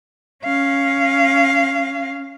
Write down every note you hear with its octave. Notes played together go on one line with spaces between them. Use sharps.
C#4 F5